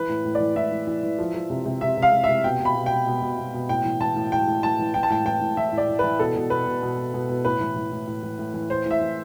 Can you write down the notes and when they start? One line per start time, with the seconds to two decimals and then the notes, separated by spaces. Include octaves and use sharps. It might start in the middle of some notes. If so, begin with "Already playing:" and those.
Already playing: E3 B4
0.09 A2
0.25 A2
0.35 D5
0.40 E3
0.56 A2 E5
0.72 E3
0.87 E3
1.03 E3
1.19 F3
1.34 F3
1.50 C3
1.66 C3
1.81 C3 E5
1.97 C3
2.02 F5
2.12 C3
2.24 C3 E5
2.44 B2 G5
2.60 B2
2.65 B5
2.75 B2
2.86 B2 G5
3.07 B2
3.22 B2
3.38 B2
3.54 B2
3.69 A2 G5
3.85 E3
4.00 E3 A5
4.16 A2
4.32 A2 G5
4.47 A2
4.63 E3 A5
4.79 E3
4.94 E3 G5
5.03 A5
5.10 A2 G5
5.25 E3 G5
5.42 A2
5.57 E3 E5
5.73 A2
5.78 D5
5.89 A2
5.99 E3 B4
6.19 B2 A4
6.36 B2
6.50 B2 B4
6.67 B2
6.82 B2
6.98 B2
7.14 B2
7.29 B2
7.45 A2 B4
7.61 E3
7.76 E3
7.92 A2
8.08 A2
8.23 E3
8.39 A2
8.54 E3
8.70 A2 C5
8.86 A2 E5
9.01 E3